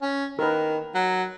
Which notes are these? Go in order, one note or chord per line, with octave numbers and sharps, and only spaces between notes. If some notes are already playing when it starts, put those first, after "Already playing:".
C#4
D#3 A#4 B4
F#3